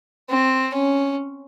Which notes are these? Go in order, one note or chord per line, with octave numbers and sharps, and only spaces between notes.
C4
C#4